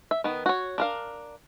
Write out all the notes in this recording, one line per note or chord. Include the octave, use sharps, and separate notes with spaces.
E5
D#3 B3
F#4 C#5
D4 A#4 F5